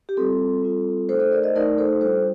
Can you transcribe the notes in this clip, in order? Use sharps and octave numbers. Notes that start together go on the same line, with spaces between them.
G4
G3 C4 F4 A4
G3 C4 F4
A3 D#4 A4 C5
A4 C5
A#4 D5
C5 D#5
A3 D#4 A#4 D5
A4 C5
G3 D4 F4 A4 C5